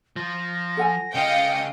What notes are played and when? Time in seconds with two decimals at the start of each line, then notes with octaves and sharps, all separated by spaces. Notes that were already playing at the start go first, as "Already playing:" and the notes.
0.16 F3 A#6
0.77 A4 F#5 G#5
1.15 C#3 F4 D#5 F5 G5 C#7